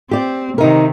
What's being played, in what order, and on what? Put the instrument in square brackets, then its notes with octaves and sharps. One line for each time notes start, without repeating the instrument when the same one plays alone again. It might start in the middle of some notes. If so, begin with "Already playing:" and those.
[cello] C4 [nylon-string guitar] G4 D5
[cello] C3 D#3 [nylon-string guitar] D#4 A#4